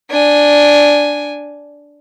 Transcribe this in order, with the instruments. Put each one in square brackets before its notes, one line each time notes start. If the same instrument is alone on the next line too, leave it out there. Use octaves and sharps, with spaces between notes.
[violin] D4 G#5